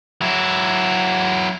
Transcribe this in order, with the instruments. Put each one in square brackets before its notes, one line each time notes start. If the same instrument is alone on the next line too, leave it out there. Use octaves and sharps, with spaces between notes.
[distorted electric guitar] F#3 E4